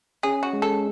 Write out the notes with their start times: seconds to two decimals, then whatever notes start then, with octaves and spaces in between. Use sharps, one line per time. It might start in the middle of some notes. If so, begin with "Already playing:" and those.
0.23 C#4 G#4
0.43 F#4
0.53 G#3
0.62 A4